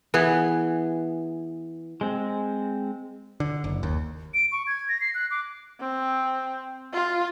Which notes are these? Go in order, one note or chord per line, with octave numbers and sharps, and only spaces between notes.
E3 B3 G#4
G#3 C4
D3
F#1
D#2
D7
C#6
G#6
A#6
C7
F#6
D6
C4
F4